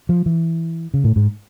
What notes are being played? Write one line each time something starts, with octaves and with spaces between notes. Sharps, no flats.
F3
E3
C#3
A2
G#2